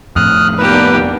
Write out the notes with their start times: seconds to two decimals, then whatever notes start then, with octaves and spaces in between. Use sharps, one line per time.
0.16 F2 A2 D#6 F6 F#6
0.58 A#3 B3 D4 D#4 G4 B4